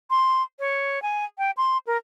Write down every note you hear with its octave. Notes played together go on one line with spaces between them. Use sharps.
C6
C#5
G#5
G5
C6
A#4